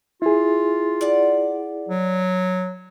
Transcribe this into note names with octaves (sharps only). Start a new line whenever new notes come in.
E4 F4 G#4
D5 F#5
F#3